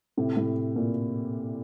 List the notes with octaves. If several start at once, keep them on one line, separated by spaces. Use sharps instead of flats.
A2 C3
A2
A#2